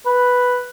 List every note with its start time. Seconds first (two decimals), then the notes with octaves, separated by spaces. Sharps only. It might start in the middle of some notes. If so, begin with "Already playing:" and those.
0.06 B4